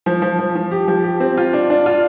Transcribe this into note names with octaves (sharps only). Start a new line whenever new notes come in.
F3
F3
F3
F3
G4
F3
G4
C4
F4
D4
D4
F4